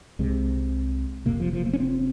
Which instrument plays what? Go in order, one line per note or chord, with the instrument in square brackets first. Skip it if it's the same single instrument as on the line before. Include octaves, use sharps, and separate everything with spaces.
[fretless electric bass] C2 C3 G#3
F1 F2 C3 A#3
F3
F3
A#3
C#4
C4